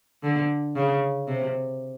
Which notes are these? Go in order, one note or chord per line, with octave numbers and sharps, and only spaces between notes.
D3
C#3
C3